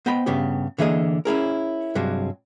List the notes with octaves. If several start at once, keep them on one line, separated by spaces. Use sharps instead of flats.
B3 C5 D#5 G5 B5
G2 C#3 B3 G4
D3 E3 A#3 G#4 D#5
C#4 E4 G#4 A#4
G2 C3 F#3 G#3